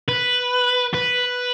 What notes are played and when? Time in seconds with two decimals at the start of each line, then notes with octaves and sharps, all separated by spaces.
0.08 B4
0.94 B4